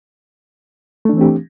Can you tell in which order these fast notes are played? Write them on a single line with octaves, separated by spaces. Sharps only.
A3 D4 E3 C4 G4